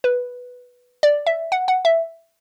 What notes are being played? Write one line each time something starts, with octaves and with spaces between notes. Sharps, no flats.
B4
D5
E5
F#5
F#5
E5